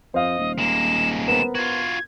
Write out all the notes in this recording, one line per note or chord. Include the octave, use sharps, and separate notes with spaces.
F2 C5 D#5 F5
D#1
G#3 A#3 E7
B3 A#4 C5 E7
F4 F#4 G#6